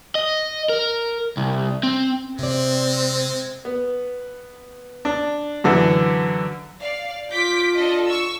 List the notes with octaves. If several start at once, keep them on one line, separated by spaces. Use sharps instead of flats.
D#5
A#4
C2
C4
C3 G#3 C4 D5
B3
D4
F#2 D3 E3
D5 F5
F4 D6 G6 B6
D4 A4 D#5
C#6 E6